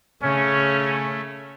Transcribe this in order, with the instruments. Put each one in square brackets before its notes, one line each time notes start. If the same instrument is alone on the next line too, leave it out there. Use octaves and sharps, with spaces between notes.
[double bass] C#3 [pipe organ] A3 [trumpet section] C#4